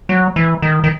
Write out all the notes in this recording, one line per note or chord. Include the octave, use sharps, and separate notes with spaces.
F#3
E3
D#3
D#3